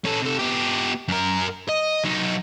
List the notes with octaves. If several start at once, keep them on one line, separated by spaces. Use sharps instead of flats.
C#4 A4
C3 A4
B3 G4
F#2 A#4
D#5
F#3 D#4